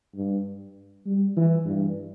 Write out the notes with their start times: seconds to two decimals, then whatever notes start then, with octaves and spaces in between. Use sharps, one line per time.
0.16 G2
1.06 G3
1.36 E3
1.65 G2